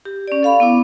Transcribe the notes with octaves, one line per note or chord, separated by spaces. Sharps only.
G4
C#4 D5
A4 F5 B5
B3 E4 D6